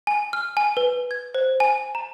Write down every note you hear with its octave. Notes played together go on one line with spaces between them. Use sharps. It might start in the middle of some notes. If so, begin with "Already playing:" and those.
G#5
F6
G#5
B4
G#6
C5
G#5
A#5